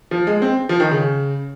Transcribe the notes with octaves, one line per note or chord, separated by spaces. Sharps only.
F3
G#3
C4
F3
D#3
C#3